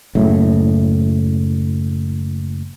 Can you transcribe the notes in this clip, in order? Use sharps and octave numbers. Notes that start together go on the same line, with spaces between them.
F#1 A2